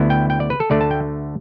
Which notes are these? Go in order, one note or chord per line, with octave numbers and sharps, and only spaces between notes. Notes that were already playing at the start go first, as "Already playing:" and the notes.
Already playing: D2 D3 B3 E4
G5
G5
D5
B4
A4
D2 D3 A3 D5
A5
G5